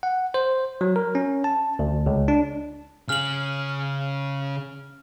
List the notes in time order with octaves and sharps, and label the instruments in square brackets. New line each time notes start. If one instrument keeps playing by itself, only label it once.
[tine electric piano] F#5
C5
F#3
A#4
C#4
A5
D2
C#2
D4
[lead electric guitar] C#3 G#4 [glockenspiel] F6 F#7